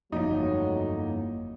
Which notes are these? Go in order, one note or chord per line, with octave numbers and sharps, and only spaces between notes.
G1 F2 A2 F#3 A#3 D#4